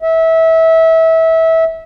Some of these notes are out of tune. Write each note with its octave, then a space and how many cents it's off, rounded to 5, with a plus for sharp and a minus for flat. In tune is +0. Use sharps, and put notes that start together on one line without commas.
E5 -25